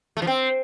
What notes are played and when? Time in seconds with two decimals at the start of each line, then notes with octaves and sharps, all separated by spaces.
0.17 A3
0.22 F3
0.27 C4